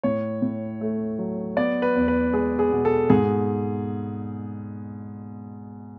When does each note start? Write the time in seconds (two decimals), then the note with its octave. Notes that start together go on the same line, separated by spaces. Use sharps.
0.03 A2 C#5
0.42 A2
0.81 A3
1.19 F#3
1.57 B3 D5
1.82 B4
1.95 E2
2.08 B4
2.33 G#3 G#4
2.59 G#4
2.72 B2
2.85 A4
3.10 G#2 G#4